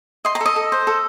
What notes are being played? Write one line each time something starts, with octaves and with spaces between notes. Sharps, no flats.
D#5 C6
A#5
A4 D#5
A4
C5
A4